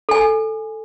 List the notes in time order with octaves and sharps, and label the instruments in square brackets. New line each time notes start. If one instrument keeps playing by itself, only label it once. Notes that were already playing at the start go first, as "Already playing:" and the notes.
[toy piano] A4 G#5